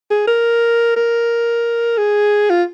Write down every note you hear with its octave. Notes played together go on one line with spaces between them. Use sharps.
G#4
A#4
A#4
G#4
F4